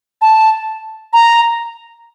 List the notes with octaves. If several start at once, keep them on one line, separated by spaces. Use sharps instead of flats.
A5
A#5